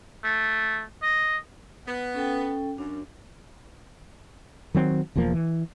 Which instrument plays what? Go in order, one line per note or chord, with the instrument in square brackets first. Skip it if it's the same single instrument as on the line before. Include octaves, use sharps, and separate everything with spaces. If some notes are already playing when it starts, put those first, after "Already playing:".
[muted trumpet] A3
D#5
[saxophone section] B3
[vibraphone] C#4 A4 G5
[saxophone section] F#2 [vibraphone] D4
[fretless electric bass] D#3 F#3 C4
E1 E2 F3 A#3
E3